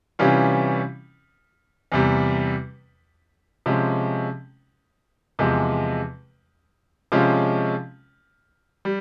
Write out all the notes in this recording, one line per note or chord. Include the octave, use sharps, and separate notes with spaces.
C3 E3 G3 C#4 F4
E2 C3 G3
C3 F3 G#3 C#4
E2 C3 F3 G#3
C3 F3 G#3 C#4 F4
G3